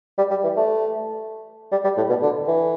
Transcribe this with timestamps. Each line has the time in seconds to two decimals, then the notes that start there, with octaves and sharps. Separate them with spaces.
0.18 G3
0.30 G3
0.43 E3
0.57 A3
1.71 G3
1.84 G3
1.97 A2
2.09 B2
2.22 D3
2.48 E3